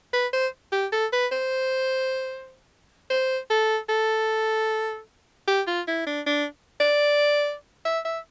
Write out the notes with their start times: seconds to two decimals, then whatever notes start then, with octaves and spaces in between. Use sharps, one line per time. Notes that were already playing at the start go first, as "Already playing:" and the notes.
0.13 B4
0.33 C5
0.72 G4
0.92 A4
1.13 B4
1.32 C5
3.10 C5
3.50 A4
3.89 A4
5.48 G4
5.67 F4
5.88 E4
6.07 D4
6.26 D4
6.80 D5
7.85 E5
8.05 E5